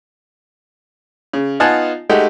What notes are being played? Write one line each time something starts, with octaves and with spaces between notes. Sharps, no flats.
C#3
B3 D#4 F4 F#5 G#5 A5
G#3 A3 D#4 F#4 G4